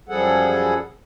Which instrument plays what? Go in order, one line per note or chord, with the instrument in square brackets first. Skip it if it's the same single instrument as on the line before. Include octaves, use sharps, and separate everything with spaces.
[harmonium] F#2 F3 G3 G#4 A4 F#5